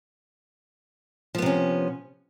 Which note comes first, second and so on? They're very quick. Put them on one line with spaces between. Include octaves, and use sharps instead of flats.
F3 B3 C3 C#4